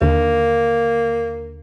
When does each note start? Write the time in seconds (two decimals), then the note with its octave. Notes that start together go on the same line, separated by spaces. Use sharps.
0.02 D#2 D3 A#3